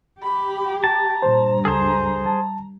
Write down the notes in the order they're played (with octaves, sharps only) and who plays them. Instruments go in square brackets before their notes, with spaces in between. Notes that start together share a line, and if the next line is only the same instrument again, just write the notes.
[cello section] G4 [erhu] B5
[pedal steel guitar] A5 [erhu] A#5
[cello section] G2 [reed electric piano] A#2 C5
[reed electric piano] C#2 A4 [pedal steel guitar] G#4 C5
[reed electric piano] A5